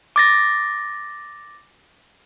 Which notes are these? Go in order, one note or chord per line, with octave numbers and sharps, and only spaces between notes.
D6 A6 A#6